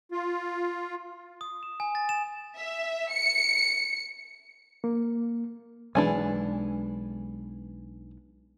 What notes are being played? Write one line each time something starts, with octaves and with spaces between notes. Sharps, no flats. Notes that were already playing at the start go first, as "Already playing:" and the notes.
F4
D#6
E7
G#5
A6
E7
E5
C#7
A#3
B1 E3 G#3 B3 D4 G#5